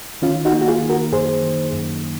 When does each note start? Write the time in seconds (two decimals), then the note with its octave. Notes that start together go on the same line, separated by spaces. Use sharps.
0.22 D#3 C#4 F4
0.45 D#4 F#4
0.53 A#3
0.61 F#4
0.68 F4 G#4
0.83 D#3
0.90 F#4 A#4
1.12 F#2 G#4 C5
1.43 D#3
1.73 F#2